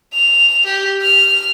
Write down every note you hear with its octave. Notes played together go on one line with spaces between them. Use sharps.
F7
G4
F6